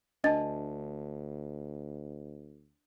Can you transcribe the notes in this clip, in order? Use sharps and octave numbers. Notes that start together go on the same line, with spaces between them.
D2 D4 D#5 A5 A6